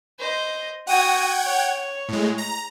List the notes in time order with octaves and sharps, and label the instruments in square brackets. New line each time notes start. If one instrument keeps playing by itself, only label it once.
[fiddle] C5 D#5
[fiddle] F#4 D#6 [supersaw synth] F#5 G5 G#6
[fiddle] C#5
[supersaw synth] A2 G#3
A#5